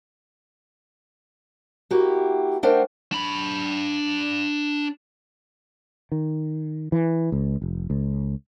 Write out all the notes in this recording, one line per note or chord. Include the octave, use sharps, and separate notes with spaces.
A#3 E4 F#4 G4
A3 D4 A#4 C5 F#5 G5
D4 B5
D#3
E3
C#2
F1
C#2